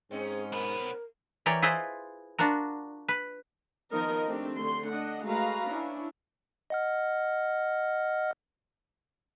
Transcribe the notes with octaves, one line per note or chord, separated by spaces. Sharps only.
G#2 C4 C#4 D#4 G#4
B1 B3 A#4
E3 A#4 C#5 D5 G5
E4 F4 G#4 B4 C5 D#5
D4 F4 F#4 A#4
B4
D#3 F3 B3 D#4 A#4 D#5
A3 C4 D4 G4
D3 A3 C6
D4 D#5 F#5
G#3 A3 F#4 B4 F5 A#5
C#4 D4 E4
D#5 F#5 F6